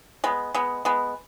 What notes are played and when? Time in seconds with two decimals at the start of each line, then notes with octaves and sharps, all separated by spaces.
0.24 G#3 B3
0.55 G#3 B3
0.85 G#3 B3